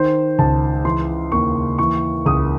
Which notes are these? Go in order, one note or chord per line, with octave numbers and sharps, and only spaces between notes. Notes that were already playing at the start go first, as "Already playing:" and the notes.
Already playing: D#3 C5
C#2 A5
E3 C6
D#2 C#6
E3 C#6
C#2 D#6